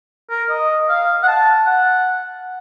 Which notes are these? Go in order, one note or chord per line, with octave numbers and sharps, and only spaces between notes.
A#4
D#5
F5
F#5
A5
F#5